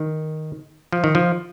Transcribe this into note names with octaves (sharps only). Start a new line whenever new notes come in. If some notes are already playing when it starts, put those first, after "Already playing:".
Already playing: D#3
F3
D#3
F3